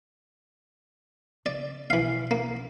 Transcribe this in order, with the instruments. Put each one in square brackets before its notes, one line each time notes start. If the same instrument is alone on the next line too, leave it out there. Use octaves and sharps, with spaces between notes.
[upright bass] C#3 [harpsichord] D5
[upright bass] B1 [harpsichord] E3 F5
[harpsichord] A#3